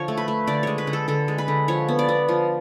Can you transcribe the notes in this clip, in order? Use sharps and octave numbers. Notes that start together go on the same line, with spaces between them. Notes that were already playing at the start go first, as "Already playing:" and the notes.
Already playing: D3 F3 C#5
A3
B4
A3
D3 D5
G#3 C#5
B4
D3
A4
D3 A4
G#3
B4
D3
F3 C#5
B3
D5
B3
F3